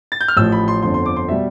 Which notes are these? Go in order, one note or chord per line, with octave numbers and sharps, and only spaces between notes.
A6
G6
F6
A1 A2 F3 E6
B5
C6
G1 F2 D3 C6
C6
D6
C6
B2 G3 E5